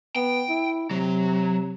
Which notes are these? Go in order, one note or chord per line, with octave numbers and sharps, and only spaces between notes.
B3 G5
E4
C3 F#3